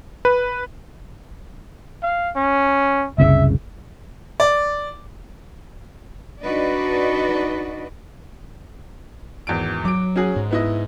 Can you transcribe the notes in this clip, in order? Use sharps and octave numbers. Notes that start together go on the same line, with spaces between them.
B4
F5
C#4
F#1 C2 C#3 E5
D5
D4 D#4 F#4 B4 D5 D#5
G#1 E2 D7
F#3 D6 D7
C#4 F#4 G#4
G#2
B3 E4 D#5